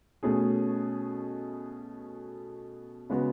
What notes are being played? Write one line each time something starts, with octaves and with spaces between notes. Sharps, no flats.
B2 A3 C#4 G#4
C#3 G#3 B3 F#4